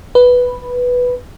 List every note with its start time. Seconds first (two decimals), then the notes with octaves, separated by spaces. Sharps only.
0.15 B4